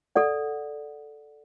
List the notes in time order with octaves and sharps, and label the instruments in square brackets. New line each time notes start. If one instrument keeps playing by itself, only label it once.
[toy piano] A4 D5 F#5